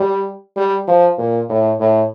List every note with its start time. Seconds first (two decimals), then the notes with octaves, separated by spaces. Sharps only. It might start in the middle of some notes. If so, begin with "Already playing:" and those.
Already playing: G3
0.57 G3
0.88 F3
1.19 A#2
1.49 A2
1.80 A2